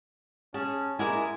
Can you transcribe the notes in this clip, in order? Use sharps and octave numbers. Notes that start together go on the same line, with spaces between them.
C#4 G#4 A5
G#3 E4 A#4 D5 G#5